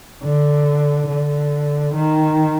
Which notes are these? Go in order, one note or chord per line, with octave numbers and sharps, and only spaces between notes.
D3
D3
D#3